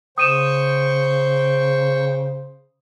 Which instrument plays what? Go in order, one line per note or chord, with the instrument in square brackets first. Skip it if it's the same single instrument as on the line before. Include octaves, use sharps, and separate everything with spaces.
[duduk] C#3 [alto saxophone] C5 [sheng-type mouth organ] G5 C#6 [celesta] D#6 D#7 E7